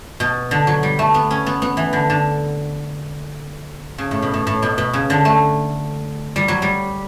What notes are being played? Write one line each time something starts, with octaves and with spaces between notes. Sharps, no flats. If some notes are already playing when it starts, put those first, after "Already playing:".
B2
D3
F#3
G3
A3
B3
C#4
B3
B3
E3
D3
D3
C#3
A2
B2
A2
A2
B2
B2
C#3
D3
A3
G3
F#3
G3